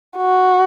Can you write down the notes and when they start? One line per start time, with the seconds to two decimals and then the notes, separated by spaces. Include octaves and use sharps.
0.17 F#4